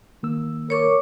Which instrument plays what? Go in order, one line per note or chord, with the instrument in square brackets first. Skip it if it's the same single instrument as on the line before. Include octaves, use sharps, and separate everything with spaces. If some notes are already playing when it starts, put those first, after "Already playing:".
[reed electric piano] D#3 A#3 E6
[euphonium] A#4 [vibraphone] C#5 C#6 D6